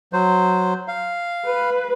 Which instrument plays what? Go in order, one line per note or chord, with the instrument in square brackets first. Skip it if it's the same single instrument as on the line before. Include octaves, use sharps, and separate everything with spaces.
[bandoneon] F#3 C5
F5
[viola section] B4